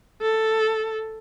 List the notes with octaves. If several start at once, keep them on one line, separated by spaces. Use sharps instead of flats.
A4